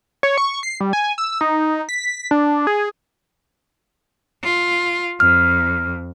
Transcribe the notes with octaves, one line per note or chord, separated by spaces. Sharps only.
C#5
C#6
C7
G3
G#5
E6
D#4
B6
D4
G#4
F4
F2 F6